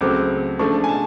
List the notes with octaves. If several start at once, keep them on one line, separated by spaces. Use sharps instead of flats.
C#2 C#3 F#3 A3 C4 D6
C#3 F3 A3 D4 C#6
G#5
A5